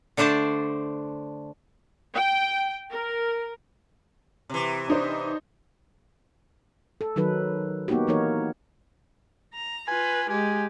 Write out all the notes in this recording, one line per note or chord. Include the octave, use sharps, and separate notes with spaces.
D3 A3 D4 C5 D5 A5
G5
A#4
C3 E3
D4 D#4 C5
A4
D#3 F#3 D#4 A4 B4
A#3 B3 D#4 F#4 G4
E3 A#3 D#4 A#4 C#5
A#5
F4 B4 G#5
G#3 G4 G#5